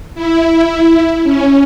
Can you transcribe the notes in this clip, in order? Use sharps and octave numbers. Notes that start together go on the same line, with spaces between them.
E4
C#4